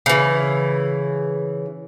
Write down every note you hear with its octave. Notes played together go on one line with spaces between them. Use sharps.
C#3 E3